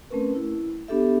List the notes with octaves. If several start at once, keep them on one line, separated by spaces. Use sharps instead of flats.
A3 C4 C#4 A#4 B4
E4
B3 D4 G4 A4 E5